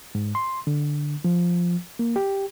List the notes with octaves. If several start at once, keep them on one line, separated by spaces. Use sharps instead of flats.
G#2
C6
D3
F3
A#3
G4